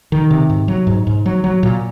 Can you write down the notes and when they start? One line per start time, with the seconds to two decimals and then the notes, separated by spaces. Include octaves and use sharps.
0.12 D#3
0.31 C3
0.50 G#2
0.68 F#3
0.87 G#2
1.07 G#2
1.26 F#3
1.44 F#3
1.63 A#2